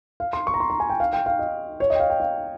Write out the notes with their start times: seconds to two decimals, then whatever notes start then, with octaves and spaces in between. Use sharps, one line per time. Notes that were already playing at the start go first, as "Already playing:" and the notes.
0.20 F5
0.33 C6
0.47 C#6
0.54 A#5
0.60 C6
0.70 A#5
0.80 G#5
0.90 G5
1.00 F5
1.13 G5
1.26 F5
1.39 D#5
1.80 C#5
1.90 D#5
1.95 G5
2.00 F5
2.10 G5
2.20 F5